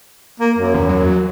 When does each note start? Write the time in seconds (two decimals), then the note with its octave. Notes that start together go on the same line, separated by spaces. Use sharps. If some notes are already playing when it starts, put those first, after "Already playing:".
0.40 A#3
0.58 F#2
0.74 E2
0.89 F#3